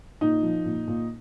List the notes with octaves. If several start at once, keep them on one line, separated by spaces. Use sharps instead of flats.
A#2 D#4
F3
A#2
A#2